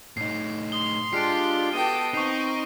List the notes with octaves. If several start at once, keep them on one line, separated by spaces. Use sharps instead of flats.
A2 D#4 C7
C6 D#6 G7
G#3 D4 F4 G4 C7 D7
B3 F#4 A4 D#5 G5 D#7
C4 D#4 A#4 C#6 C7